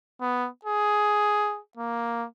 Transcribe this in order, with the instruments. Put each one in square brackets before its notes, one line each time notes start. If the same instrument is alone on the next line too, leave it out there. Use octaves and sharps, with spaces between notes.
[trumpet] B3
G#4
A#3